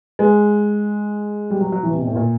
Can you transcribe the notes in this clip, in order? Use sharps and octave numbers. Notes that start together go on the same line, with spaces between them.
G#3
G3
F#3
F#3
E3
C3
B2
A2
A#2